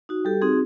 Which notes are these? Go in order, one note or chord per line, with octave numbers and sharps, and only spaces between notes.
D#4 F#4
G3 G4 A4
C4 D#4 F#4 G#4